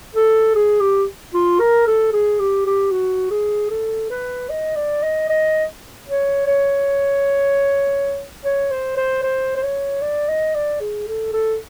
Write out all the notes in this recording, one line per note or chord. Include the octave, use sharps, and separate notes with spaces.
A4
G#4
G4
F4
A#4
A4
G#4
G4
G4
F#4
G#4
A4
B4
D#5
D5
D#5
D#5
C#5
C#5
C#5
C5
C5
C5
C5
C#5
D5
D#5
D5
G#4
A4
A4